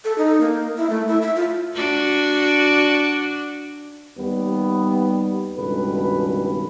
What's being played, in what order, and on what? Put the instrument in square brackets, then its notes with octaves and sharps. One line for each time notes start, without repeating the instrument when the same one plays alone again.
[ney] A4
D#4
A#3
E4
A3
E4
E5
F4
[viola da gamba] D4 F#4 D5
[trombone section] D#2 G3 B3
C#2 G2 B2 D#3 A4 B4